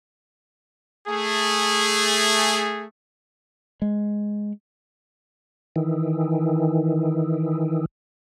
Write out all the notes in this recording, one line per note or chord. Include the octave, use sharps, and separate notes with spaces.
A3 G#4
G#3
D#3 E3